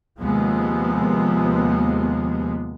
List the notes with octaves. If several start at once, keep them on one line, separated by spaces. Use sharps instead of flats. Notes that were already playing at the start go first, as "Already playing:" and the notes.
D#2 C3 F3 G#3 B3